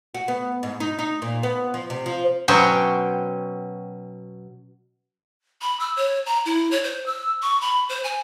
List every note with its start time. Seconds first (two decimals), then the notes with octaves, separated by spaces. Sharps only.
0.14 F#4
0.28 B3
0.63 G#2
0.80 D#4
0.99 D#4
1.22 A#2
1.43 B3
1.74 F3
1.90 C3
2.06 F3
2.48 B2 F#3 C#4 C5 G5
5.62 B5
5.80 E6
5.96 C#5
6.26 A#5
6.45 E4
6.71 C#5
6.84 C5
7.06 E6
7.42 C#6
7.61 B5
7.89 C5
8.04 G#5